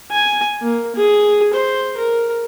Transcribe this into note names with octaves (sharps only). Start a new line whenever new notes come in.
G#5
A#3
G#4
C5
A#4